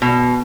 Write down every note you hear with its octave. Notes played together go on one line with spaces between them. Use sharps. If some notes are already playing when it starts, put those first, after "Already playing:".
B2